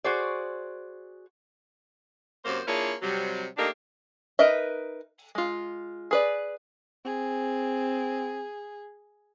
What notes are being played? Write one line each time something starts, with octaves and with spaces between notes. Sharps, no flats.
F#4 G#4 C5 D5
F#2 C3 A#3 C5
A#3 D4 E4 F4 G#4 C#5
C3 F#3 G3
A3 A#3 D4 D#4 G4 A#4
D#4 A#4 B4 D#5 E5
G#3 F4
G#4 B4 D5
C4 G#4